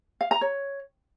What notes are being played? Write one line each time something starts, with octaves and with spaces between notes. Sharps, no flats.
F5
A#5
C#5